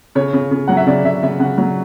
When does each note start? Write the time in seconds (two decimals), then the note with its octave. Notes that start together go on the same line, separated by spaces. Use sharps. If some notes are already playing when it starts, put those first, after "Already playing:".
0.15 C#3 C#5
0.33 C#3
0.51 C#3
0.68 F#3 F#5
0.77 E5
0.87 C#3 D5
1.04 C#3 E5
1.23 C#3 E5
1.39 C#3 F#5
1.58 F#3